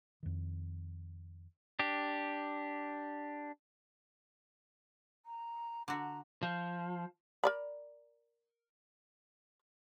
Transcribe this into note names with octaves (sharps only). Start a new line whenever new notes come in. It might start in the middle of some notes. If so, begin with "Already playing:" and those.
F2 D#3
D4 G4
A#5
D3 F#4 A#5
F3
A#4 D5 B5